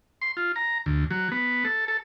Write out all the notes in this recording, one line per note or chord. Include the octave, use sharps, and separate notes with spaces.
C6
F4
A#5
D2
F#3
B3
A4
A4